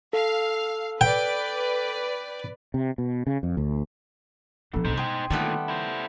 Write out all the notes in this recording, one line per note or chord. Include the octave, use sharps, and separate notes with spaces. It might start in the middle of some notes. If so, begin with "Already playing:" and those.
A4 F5
B4 D5 G5
C3
B2
C#3
F2
D2
A#2 F3 B3 D4 A4
C2 A#2 D#4 C5
B2 G#4 G5 C6
D2 A#2 D#3 G3 A3 B3
E4 C5